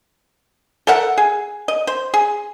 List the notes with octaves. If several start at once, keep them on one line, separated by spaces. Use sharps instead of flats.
A4 A#4 E5 F#5
G#4
D#5
C5
G#4